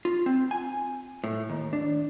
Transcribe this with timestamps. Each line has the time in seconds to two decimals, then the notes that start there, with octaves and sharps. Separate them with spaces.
0.05 F4
0.26 C4
0.51 G#5
1.24 A2
1.49 D#2
1.73 D4